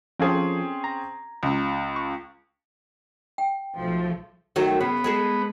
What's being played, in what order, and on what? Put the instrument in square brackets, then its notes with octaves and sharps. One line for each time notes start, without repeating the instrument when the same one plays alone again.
[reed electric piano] F3 F4 A4 [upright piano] C4 C#4 G#4
[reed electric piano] A#5
[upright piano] C#2
[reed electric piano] C#6
[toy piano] G5
[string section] B1 F3 A3
[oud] D#3 F#3 A3
[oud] C#3 [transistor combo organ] B3
[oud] G#3 G#4 A4